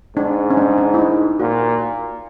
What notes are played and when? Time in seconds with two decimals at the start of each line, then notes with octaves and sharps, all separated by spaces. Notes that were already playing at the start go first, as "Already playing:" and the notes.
0.16 G#2 D4
0.50 C#4
0.57 D4
0.78 D4
0.94 E4
0.99 D#4
1.39 A#2 F#4